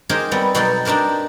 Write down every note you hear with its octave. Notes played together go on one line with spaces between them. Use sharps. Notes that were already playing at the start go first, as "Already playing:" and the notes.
D#4 G4 G#4 A#4 C5
G3 B3 C4
B2 F#3 D#4 F#4 A4 G5
D4 D#4 G4 A#4 C5